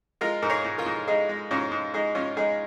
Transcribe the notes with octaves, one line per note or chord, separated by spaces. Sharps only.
G#3 F4 A#4
G#2 A#4
G#4 C#5
G#2
F4 A#4
G#2
G#3 D#4 G#4
G#3
G#2 C#4 F4
G#2
G#3 D#4 G#4
G#2 C#4 F4
G#3 D#4 G#4